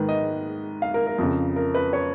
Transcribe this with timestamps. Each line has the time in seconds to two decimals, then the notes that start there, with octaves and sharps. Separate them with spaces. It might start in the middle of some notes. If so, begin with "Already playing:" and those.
Already playing: G#2 D#3 B4
0.09 D#5
0.82 F5
0.94 A#4
1.07 A#4
1.18 F2 C#3
1.56 A#4
1.75 B4
1.93 C#5